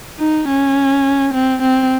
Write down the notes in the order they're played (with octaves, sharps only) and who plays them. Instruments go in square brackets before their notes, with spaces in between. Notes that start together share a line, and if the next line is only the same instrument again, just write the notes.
[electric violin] D#4
C#4
C4
C4